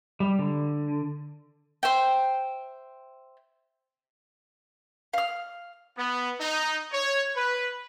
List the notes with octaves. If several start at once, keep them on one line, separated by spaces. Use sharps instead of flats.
G3
D3
C5 E5 G5
F5 F6
B3
D#4
C#5
B4